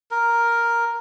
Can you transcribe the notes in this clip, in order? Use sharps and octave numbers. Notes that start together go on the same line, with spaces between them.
A#4